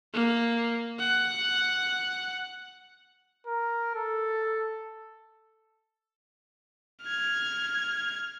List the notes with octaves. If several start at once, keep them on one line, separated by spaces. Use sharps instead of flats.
A#3
F#5
A#4
A4
F6 G#6